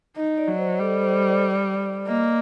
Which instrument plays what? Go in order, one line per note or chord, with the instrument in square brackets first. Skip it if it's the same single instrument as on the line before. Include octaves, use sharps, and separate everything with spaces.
[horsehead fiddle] D#4 [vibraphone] D#5
[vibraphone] D5
[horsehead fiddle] F#3
[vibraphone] C5
[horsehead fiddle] G3 [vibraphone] A4
[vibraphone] C5
D5
[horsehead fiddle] A#3 [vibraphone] D#5